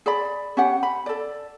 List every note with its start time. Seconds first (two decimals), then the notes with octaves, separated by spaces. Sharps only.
0.06 G#4 D5 B5
0.57 C#4 G4 F#5
0.83 B5
1.06 A4 D5